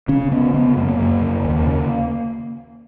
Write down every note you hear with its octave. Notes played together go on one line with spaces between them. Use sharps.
C#3 C#4
C#3 B3
C#3 B3
F#2 A#3
F#2
C#3
D#2
C#3